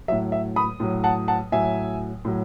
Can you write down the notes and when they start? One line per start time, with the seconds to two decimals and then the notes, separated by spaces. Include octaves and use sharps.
0.08 F#3 E5
0.12 A2
0.32 E5
0.56 B5 D#6
0.80 A2 F#3
1.04 F#5 A5
1.28 F#5 A5
1.52 A2 F#3 E5 G#5
2.25 A2 F#3